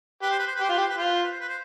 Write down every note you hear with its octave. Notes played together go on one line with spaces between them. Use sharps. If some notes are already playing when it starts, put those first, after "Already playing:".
G4 B4
C5
B4
C5
B4
G4
C5
F4 B4
G4
C5
B4
F4 C5
B4
C5
B4
C5
B4
C5